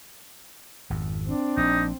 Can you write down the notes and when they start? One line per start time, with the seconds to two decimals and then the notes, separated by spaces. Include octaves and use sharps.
0.90 G#1 F2
1.27 C4 D4
1.57 A#1 D#4